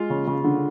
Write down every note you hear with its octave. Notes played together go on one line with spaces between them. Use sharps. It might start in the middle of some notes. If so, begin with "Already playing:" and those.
Already playing: G#3 F4
C#3
C#3
D3